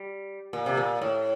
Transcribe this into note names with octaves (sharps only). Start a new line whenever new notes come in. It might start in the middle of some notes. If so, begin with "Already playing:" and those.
Already playing: G3
A#2
C3
A#2
A2